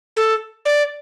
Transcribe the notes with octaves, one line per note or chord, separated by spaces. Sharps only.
A4
D5